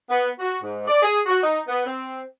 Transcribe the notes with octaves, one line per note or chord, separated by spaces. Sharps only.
B3
F#4
G#2
D5
G#4
F#4
D#4
B3
C4